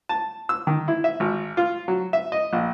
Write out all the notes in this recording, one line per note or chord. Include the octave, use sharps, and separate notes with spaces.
A5
E6
D#3
E4
E5
G#1
F4
F#3
E5
D#5
A#1